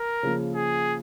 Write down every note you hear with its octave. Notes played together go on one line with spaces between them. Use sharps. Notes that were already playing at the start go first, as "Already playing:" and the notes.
Already playing: A#4
C#3 F3 A#3
G#4